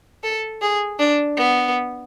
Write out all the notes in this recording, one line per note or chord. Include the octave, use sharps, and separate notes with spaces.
A4
G#4
D4
B3